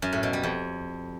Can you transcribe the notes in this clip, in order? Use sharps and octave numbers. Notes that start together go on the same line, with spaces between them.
F#2
A2
B2
G3
F2